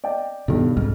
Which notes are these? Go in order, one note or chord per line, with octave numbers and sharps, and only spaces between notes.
D5 D#5 G5
B1 G2 B2 D#3
C2 F2 G#2 F6